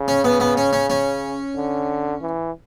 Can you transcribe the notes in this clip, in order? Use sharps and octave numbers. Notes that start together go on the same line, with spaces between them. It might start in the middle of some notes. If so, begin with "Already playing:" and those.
Already playing: C#3
C#4
B3
B3
C#4
C#4
C#4
D3
E3